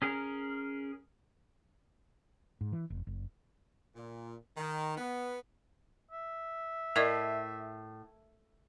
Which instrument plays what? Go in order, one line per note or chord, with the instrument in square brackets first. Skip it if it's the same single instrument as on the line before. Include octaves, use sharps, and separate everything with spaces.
[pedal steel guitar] C#4 G#4 A#4
[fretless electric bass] G#2
E3
F1
F#1
[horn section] A#2
D#3
B3
[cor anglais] E5
[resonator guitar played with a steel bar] A2 [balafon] A#4 D5 D#5